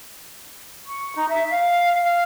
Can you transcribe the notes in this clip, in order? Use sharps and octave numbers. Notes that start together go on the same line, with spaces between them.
C#6
D#4
E5
F5
F5